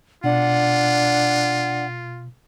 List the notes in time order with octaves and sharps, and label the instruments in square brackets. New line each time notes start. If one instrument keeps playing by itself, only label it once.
[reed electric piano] B2 [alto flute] D4 [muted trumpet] F4 [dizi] F#5